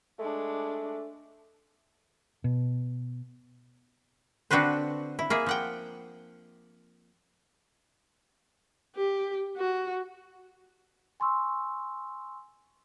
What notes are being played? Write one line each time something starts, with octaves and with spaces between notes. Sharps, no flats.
G#3 A3 D4
B2
D3 C4 D4 F#4 B4 C5
E4
A#3 G#4 E5
F3 F#5 G5
G4
F#4
G#5 C6 C#6 E6